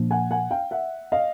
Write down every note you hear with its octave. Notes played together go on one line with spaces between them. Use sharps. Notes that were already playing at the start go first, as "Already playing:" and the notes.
Already playing: A#2 F3 A#3 D4
F#5 G#5
F#5 G#5
F5 G5
E5 F#5
D#5 F5